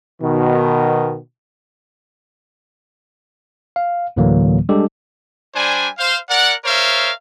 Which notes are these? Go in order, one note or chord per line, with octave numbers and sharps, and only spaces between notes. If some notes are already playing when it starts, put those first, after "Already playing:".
B2 D#3
F5
D2 A2 D3 E3 F#3 A#3
G3 G#3 D4 G4 A4
G3 D4 C5 G#5
C5 F5
A#4 D5 F#5
A#4 C5 C#5 E5 F5